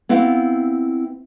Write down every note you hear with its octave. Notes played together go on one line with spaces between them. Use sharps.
B3 C4 E4 F#4 F5